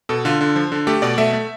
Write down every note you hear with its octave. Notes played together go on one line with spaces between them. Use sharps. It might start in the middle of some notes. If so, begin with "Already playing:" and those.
B2 A4
D3 F4
D3
F3
D3
A3 G4
B2 D5
A3 E5
A3